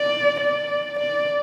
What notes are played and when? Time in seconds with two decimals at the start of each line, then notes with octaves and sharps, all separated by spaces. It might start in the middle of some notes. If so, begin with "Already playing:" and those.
Already playing: D5
0.41 D5
1.00 D5